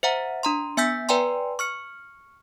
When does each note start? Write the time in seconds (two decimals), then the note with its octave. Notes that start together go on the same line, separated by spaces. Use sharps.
0.03 C5 E5 F#5 A#5
0.43 D4 A#5 C6
0.77 B3 E5 G#5 E6 G6 B6
1.09 B4 D5 G5 G#5 A#5 C6
1.59 C#6 F6 C#7